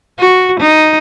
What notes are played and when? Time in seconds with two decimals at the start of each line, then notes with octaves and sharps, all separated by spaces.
0.20 F#4
0.60 D#4